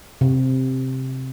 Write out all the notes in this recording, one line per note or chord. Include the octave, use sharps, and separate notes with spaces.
C3